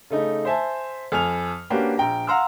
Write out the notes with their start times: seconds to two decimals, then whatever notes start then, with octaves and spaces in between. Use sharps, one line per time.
0.10 C#3 A3 D#4
0.45 C5 E5 G#5 A5
1.12 F2 G#5 F6 F7
1.70 A#3 C#4 D4 F#4 G4 B4
1.97 A#1 G5 A#5
2.27 F5 F#5 A#5 C6 E6 F6